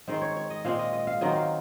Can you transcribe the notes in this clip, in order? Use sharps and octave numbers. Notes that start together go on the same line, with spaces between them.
D#3 G#3 C4 C5
C#5
C#5
D#5
A#2 G#3 C4 F5
D#5
D#5
F5
D#3 F#3 C4 D#5
F5